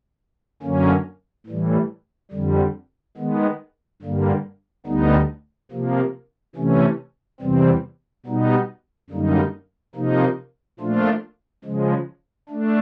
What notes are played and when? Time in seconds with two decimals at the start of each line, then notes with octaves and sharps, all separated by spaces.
0.63 F#2 D3 F#3 A#3 C#4
1.47 A2 E3 G3
2.32 F2 D3 G3
3.17 D#3 G#3 B3
4.02 G2 D3 G3 A#3
4.86 D2 D3 G3 B3 D#4
5.71 C3 F3 A#3
6.55 C3 E3 A3 C#4
7.40 E2 C3 E3 G3 C4
8.26 B2 G3 B3 D#4
9.10 F#2 D3 G3 A#3 D#4
9.95 C3 F3 A#3 D#4
10.79 A#2 F3 A3 D4 F4
11.65 C#3 F3 G#3
12.49 A3 D4